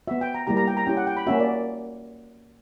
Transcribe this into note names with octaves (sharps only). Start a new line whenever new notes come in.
B3 F#4 E5
G5
A#5
G3 A#3 E4 G4 A#5
A#5
G5
A#5
C#4 E4 G4 G5
F#5
G5
B5
A#3 C#4 F#4 E5
D5